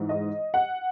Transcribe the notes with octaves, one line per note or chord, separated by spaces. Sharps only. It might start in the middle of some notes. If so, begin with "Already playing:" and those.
Already playing: G#2 E3 G#3
D#5
F#5